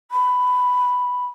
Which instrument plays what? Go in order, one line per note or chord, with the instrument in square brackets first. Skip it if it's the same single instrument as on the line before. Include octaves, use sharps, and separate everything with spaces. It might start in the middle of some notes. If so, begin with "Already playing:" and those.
[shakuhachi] B5